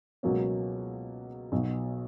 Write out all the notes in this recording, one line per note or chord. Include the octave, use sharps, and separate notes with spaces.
C#2 B2 F#3 A#3 C#4
B1 B2 F#3